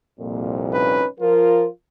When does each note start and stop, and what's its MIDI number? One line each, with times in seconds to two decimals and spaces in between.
0.20 1.02 36
0.20 1.02 41
0.20 1.02 46
0.72 1.05 61
0.72 1.05 63
0.72 1.05 71
1.20 1.67 53
1.20 1.67 65
1.20 1.65 70